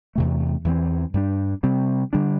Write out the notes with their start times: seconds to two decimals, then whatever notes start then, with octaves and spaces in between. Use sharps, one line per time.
0.15 E2 C3 A3
0.64 E2 E3 C4
1.14 G2 G3 D4
1.63 C3 G3 C4
2.13 D3 G3 D4